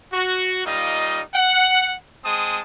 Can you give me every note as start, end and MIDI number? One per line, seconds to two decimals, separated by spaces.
0.13 0.65 66
0.65 1.21 55
0.65 1.21 58
0.65 1.21 63
0.65 1.21 65
0.65 1.21 75
1.34 1.94 78
2.24 2.60 56
2.24 2.60 60
2.24 2.60 81
2.24 2.60 87